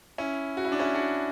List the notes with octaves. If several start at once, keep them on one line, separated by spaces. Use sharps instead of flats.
C#4 E4
F#4
E4
D4
C#4 E4
D4 F#4